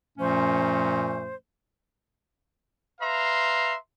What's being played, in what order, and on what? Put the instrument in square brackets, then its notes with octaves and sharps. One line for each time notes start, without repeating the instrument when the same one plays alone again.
[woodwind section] F#2 A#2 F3 A3 C#4 C5
[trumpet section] B4 E5 F5 A#5 C6